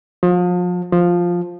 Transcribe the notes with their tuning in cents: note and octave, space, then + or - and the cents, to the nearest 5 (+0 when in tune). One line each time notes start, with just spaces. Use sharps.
F3 +35
F3 +5